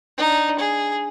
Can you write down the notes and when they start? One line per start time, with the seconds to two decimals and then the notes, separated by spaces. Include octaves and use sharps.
0.18 D4 D#4
0.59 G#4